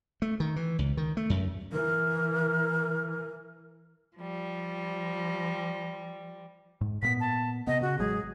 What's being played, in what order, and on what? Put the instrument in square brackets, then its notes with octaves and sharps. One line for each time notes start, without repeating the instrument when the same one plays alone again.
[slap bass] A3
D#3
E3
C#2
D#3
A3
F#2
[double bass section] E3 [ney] A#4
[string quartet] F3 G3
[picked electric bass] G#2
[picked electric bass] A#2 A#3 B3 [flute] B6
[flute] A5
[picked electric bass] C3 B3 [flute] D#5
[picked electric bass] C#3 [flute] F#4
[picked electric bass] A1 F#3 G#3 [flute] G#4